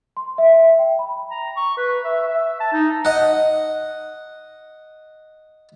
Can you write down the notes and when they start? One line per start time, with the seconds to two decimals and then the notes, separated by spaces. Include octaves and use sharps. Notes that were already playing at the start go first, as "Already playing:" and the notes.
0.17 C6
0.38 E5
0.79 G5
0.99 B5
1.31 A#5
1.57 C#6
1.78 B4
2.05 E5
2.29 E5
2.60 A5
2.73 D#4
3.05 D#5 F#5